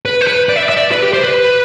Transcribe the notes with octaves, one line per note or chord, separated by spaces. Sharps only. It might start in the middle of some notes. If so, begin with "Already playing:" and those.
B4
C5
B4
D5
E5
D5
E5
D5
B4
G4
C5
B4